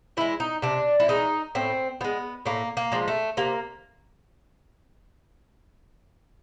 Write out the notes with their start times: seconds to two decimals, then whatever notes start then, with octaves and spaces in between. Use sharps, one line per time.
0.17 E3 G#3 E4
0.40 D#4
0.62 C3 D4
1.00 E4
1.08 E3 G#3 D#4
1.55 A2 C4
2.01 F3 G#3 B3
2.46 A2 A#3
2.77 A#3
2.92 F3 G#3
3.08 A3
3.37 C3 A#3